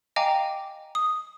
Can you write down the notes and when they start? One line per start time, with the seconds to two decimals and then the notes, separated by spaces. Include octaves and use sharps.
0.16 D#5 F5 G5 G#5 A#5 D6
0.95 D#6